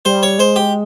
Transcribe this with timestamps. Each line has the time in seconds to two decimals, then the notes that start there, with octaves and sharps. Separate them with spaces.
0.05 G3 C5
0.23 C#5
0.39 G#3 C5
0.56 G4